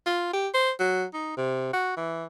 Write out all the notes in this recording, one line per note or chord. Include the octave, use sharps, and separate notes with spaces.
F4
G4
C5
F#3
D#4
C3
F#4
E3